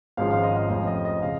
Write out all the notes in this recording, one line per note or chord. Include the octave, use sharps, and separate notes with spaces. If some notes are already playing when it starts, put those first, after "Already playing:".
G#1 G#2 F3 G#3 C#4 F5
F5
D#5
F5
F1 F2 F3 C#4 D#5
D#5
D#5
C#3 F5